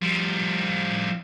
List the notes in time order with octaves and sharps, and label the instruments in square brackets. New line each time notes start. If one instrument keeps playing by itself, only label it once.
[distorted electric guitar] F3 G3